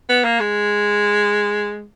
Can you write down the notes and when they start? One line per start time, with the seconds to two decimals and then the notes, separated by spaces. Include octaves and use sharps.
0.09 B3
0.24 A#3
0.40 G#3